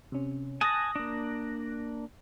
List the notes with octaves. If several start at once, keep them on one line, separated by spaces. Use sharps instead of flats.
C3 C#4
G#5 A5 D#6 F#6 A#6
A#3 D4